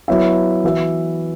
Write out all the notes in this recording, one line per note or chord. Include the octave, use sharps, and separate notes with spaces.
F#3 B3 E4 C#5 E5
E3 B3 F#4 B4 E5